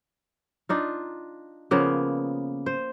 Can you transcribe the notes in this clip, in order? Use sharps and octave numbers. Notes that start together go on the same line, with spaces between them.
D4 D#4 F4
C#3 F3 A#3 B3
C5